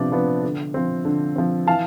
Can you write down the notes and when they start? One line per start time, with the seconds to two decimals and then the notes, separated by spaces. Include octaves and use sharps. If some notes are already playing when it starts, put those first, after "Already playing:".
Already playing: C3 F3 B3 D4
0.12 F3 B3 D4
0.43 D3
0.74 F3 C4
1.05 D3
1.36 F3 C4
1.67 E3 F5 A5